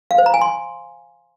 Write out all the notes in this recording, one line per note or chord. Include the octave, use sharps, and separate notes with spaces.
F5
C5
A#5
G#5
C6